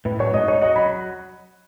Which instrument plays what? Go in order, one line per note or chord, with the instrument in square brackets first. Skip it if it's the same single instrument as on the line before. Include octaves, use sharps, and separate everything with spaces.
[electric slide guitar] A2 [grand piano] B4
[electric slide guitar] F#3 [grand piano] C#5
[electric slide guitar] G#2 [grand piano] D#5
[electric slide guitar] D#4 [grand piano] C#5
[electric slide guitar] F#4 [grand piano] D#5
[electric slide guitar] F#3 [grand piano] B5